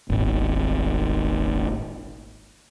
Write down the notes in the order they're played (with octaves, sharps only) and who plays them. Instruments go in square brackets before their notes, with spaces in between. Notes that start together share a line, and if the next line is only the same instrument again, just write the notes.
[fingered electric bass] D#1 G#1